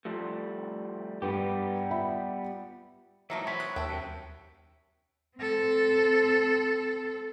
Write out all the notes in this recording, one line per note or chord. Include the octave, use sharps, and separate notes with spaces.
F3 G3 A3
G2 G3 B3 G4
F4 E5 B5
E3 F#3 A3 A#3 D#4 E5
C4 C#5 B5
B3 F#6
D#2 A4 E5 G5
F#2 C3
C4 A4